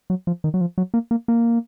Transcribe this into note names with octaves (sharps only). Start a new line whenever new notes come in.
F#3
F3
D#3
F#3
F3
F#3
A#3
A#3
A#3